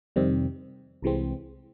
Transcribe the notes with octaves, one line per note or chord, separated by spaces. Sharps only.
F2 C3 D#3 G3 C4
C2 C3 E3 G#3 C4